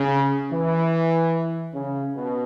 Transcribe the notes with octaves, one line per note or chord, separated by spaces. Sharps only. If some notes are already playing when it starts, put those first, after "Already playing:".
Already playing: C#3
E3
C#3
B2